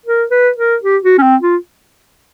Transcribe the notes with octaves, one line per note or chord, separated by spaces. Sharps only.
A#4
B4
A#4
G4
F#4
C#4
C4
F4